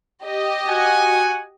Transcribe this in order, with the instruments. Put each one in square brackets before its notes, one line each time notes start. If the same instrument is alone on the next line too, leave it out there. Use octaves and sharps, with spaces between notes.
[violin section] G4 D#5
[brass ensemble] F#4 F#5 G#5